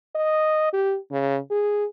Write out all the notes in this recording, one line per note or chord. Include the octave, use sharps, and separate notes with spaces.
D#5
G4
C#3
G#4